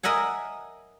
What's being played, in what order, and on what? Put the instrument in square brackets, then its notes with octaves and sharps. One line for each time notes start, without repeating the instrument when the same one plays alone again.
[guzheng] A#4 D#5 E5 F#5 G#5